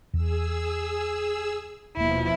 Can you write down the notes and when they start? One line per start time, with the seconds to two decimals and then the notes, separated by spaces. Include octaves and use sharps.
0.13 E2 G#4 E6
1.97 D#1 B2 F3 A#3 E4